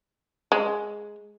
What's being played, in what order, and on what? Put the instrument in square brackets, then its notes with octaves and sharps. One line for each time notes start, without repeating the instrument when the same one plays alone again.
[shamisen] G#3